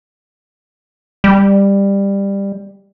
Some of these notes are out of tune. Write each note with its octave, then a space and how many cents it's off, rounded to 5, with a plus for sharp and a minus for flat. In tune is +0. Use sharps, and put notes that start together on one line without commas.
G3 +15